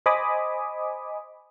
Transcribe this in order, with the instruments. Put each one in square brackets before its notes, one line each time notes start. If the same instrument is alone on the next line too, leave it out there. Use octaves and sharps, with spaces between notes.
[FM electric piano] C5 D#5 G#5 B5 D6 D#6